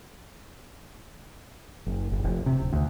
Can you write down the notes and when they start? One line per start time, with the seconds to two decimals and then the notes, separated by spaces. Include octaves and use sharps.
1.86 F#1
2.12 F#1
2.24 F1
2.46 C3
2.60 D1
2.73 D2